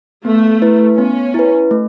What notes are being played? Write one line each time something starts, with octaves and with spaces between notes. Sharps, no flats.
A3 B3
E4 B4
B3 C#4
E4 B4
A3